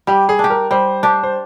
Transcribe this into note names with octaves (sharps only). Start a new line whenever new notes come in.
G3 G4
G#4
D4 G4
A#4
G3 C5
D4 G4
C5